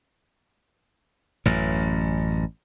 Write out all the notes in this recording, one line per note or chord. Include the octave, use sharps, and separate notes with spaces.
A1 F#2